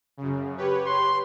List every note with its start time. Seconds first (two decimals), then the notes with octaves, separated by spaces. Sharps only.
0.17 F#2 C#3
0.57 G4 B4 C#5
0.86 C6